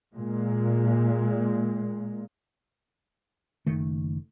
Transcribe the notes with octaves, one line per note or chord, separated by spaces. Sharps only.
A#2 G#3
F#1 D#3 A3